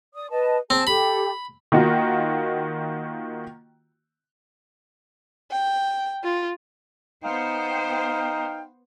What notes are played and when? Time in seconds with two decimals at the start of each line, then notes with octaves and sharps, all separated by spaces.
0.13 D5 D#6
0.31 B4 D#5 A5
0.70 C4 G#4 A5
0.87 G4 A4 B5
1.72 D#3 A#3 F4 F#4
5.52 G5
6.24 F4
7.24 B3 D#4 C5 F5 G5